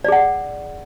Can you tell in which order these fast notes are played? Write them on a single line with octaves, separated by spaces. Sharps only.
D5 G#4 F#5